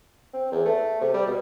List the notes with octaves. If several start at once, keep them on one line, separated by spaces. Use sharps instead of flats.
C4
E2
A3
C3
G3
B2